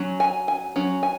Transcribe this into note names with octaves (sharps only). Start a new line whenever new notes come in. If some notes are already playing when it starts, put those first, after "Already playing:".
Already playing: F#3 C#4
G#5
G#5
F#3 C#4
G#5